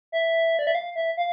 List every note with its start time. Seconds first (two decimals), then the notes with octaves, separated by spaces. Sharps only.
0.12 E5
0.59 D5
0.67 E5
0.75 F5
0.96 E5
1.17 F5